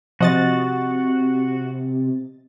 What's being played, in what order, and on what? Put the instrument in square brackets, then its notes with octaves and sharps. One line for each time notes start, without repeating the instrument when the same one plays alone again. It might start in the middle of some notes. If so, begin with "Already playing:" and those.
[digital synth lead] C3 [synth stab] F3 D#5 A6 [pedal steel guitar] F#4